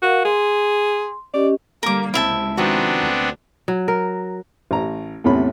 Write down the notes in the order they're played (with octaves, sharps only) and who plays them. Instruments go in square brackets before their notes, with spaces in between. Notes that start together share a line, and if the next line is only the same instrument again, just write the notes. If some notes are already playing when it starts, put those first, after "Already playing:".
[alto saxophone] F#4 [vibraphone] A#4 F5 F#5
[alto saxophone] G#4 [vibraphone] C6
[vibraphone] C#4 G4 D#5 [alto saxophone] D5
[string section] D3 G3 A#3 [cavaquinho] A#4 D6
[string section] C#2 C3 [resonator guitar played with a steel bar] C4 [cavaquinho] E4 E5 A5
[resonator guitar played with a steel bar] D#3 F3 F#4 [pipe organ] B3 C4 D4
[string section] D2
[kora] F#3
A#4
[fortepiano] A1 A#5
E2 A2 C3 C#4 B5